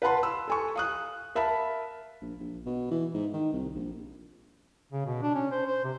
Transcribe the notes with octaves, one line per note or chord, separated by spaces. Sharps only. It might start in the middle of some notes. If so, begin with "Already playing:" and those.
B4 F5 F#5 A5 B5 C6
E6
A4 G#5 C#6
F5 D#6 F#6
A#4 E5 F5 A5 B5
A#1
A#1
B2
E3
G#2
D#3
C2
A#1
C#3
B2
D4
C#4
C5
C5
C3